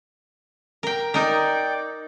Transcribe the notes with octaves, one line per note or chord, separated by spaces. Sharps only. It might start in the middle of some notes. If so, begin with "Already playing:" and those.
A#4 G5
D#4 A#4 D5 G5